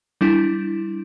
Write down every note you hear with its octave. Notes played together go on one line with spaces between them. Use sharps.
G3 D4 E4